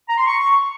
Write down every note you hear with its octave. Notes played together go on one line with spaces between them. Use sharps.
A#5
C6
C#6